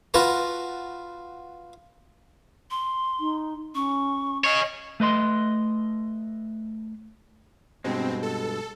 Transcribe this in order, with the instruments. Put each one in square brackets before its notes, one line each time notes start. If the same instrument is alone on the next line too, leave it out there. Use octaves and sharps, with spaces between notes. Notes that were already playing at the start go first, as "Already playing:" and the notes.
[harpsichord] F4 F#4 B4 A5 A#5
[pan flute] C6
[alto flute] D#4
[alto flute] C#4 [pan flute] C#6
[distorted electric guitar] G#4 C#5 [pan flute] D#5
[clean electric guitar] A3 B4 D#5 C6
[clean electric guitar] G2 B2 G#3 [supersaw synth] C4
[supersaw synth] A4